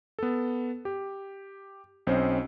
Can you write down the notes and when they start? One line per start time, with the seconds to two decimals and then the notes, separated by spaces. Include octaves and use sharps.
0.19 B3 A4
0.85 G4
2.07 B1 C4 C#4 C5 D#5